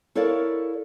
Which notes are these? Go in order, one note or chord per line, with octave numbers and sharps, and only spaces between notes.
E4 A4 A#4 C#5 D5 F5